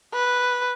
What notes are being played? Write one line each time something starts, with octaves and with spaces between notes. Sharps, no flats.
B4